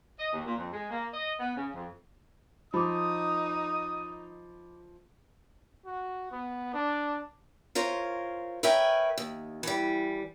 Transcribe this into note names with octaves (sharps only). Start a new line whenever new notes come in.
D#5
D#2
A#2
F2
G#3
A#3
D#5
B3
C#3
F2
F3 D#4 B5 D6 D#6
F#4
B3
D4
F4 A#4 C5 C#5
A#4 B4 C#5 E5 G5 G#5
D#2
E3 G3